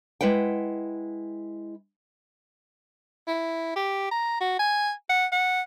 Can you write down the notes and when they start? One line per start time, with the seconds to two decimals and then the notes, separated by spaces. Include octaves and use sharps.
0.21 G#3 E4 B4 F#5 G5
3.27 E4
3.76 G4
4.11 A#5
4.41 F#4
4.59 G#5
5.10 F#5
5.32 F#5